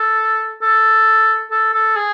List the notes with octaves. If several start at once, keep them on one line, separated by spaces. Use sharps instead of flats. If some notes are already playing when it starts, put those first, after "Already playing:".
Already playing: A4
A4
A4
A4
G#4